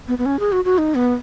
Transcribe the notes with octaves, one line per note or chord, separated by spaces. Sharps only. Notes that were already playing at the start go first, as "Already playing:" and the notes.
B3
B3
C#4
G#4
F#4
F#4
D#4
B3